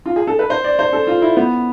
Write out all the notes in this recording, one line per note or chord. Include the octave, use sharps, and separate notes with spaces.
F4
G#4
A4
B4
C5
D5
C5
A4
F4
E4
B3